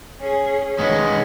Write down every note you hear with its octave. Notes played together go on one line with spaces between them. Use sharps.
C#4 G#4
D#3 G#3 B3 C#4